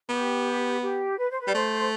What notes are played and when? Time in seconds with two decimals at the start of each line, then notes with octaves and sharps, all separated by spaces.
0.09 B3 G4
0.82 G4
1.19 B4
1.30 C5
1.41 B4
1.47 G3 D5
1.54 A3 C5